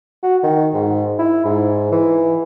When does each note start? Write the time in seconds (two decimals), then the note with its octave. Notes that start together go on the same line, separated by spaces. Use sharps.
0.23 F#4
0.43 D#3
0.74 G#2
1.19 E4
1.45 G#2
1.92 E3